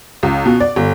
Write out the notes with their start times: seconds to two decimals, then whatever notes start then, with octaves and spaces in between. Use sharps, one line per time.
0.23 C#2
0.46 B2
0.60 D5
0.76 G1